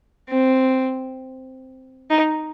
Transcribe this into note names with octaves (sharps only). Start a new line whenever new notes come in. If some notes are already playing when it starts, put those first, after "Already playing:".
C4
D#4